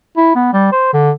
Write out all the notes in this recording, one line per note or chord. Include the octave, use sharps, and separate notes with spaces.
E4
B3
G3
C5
D3